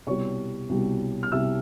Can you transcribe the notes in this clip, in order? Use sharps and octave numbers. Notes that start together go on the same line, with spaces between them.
C2 B2 G3 C#5 C#6
C2 B2 G3
F6
C2 B2 G3 E5 E6